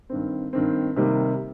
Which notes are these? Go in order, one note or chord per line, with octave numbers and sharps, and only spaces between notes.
G2 D#3 C4
G2 D#3 C4
C3 D#3 G3 A#3